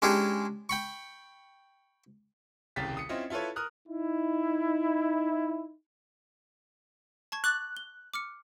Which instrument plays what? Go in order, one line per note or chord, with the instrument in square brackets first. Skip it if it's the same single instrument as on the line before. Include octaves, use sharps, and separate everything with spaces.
[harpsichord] G#3 C#4 D4 E4 G4 G#4
G5 B5 C#6
[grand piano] D#1 C2 C#3 G4 A6 B6
D#6 C#7
C4 C#4 E4 F4 D#5
E4 F4 A4 B4 C#5
A#4 D#6 F6 F#6
[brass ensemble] D#4 E4
[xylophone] A5 C#6 G#6
[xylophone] C#6 D6 A6 [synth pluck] F#6
[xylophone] G7
D6 F6 C#7